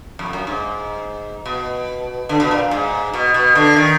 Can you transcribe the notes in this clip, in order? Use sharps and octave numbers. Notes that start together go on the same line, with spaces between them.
F2
F#2
G#2
B2
D3
B2
A#2
G#2
B2
B2
D3
D#3